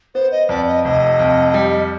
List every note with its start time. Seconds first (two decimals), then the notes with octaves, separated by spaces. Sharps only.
0.15 B3 C5
0.32 D#5
0.49 F2 D5
0.67 D#5
0.84 F1 D#5
1.19 F2
1.54 G3